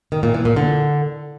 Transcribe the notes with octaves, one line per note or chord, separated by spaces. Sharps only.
D#3
A#2
E3
A#2
D3